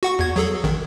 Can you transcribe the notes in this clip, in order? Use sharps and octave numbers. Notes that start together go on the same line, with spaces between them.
F#4 F#5 C#6
E2 G#6
F#3 G#4 A4
A1 D#3